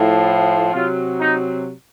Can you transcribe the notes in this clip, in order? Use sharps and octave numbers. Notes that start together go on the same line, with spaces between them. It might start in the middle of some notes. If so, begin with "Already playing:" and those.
Already playing: A2 F3
C3 F#3 F4
D#4